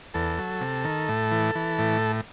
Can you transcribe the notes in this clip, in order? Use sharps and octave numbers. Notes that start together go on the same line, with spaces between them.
E2 A4
F#3
C3
D#3
A2
E3
E3
A2